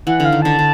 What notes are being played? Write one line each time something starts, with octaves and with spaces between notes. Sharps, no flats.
E3 F#5
D3 F5
D#3
D3 A5
D3